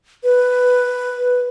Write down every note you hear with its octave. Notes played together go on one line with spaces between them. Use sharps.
B4